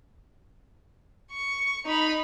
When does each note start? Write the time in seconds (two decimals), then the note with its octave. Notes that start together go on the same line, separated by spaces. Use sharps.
1.32 C#6
1.85 D#4 B5